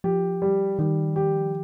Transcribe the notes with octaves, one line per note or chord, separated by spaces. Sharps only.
F3 G4
G3
D#3 G3
G4